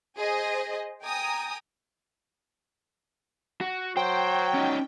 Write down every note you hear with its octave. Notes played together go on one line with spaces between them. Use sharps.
G#4 C5 D#5
G5 G#5 A#5 D#6
F#4
F#3 C5 G5
C#4 D#4